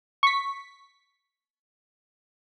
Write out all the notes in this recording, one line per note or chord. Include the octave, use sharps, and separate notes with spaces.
C#6 B6